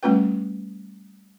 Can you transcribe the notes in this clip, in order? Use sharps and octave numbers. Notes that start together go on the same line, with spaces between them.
G3 A3 C#4 F4 B4 G5